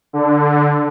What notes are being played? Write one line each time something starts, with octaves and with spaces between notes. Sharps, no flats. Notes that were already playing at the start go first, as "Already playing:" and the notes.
D3